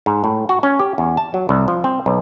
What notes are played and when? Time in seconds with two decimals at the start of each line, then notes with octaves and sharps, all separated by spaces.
0.06 G#2
0.24 A2
0.49 F#4
0.63 C#4
0.79 G4
0.98 E2
1.17 A5
1.34 F#3
1.49 C2
1.68 F3
1.84 C4
2.06 B1